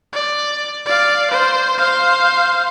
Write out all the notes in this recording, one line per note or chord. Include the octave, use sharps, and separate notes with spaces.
D5
D5 F5
C5
C5 F5